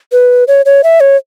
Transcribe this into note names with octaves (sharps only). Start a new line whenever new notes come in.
B4
C#5
C#5
E5
C#5